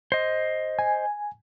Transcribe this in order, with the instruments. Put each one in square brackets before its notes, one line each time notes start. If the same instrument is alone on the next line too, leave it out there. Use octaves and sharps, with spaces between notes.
[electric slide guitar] C5 D#5
[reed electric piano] G#5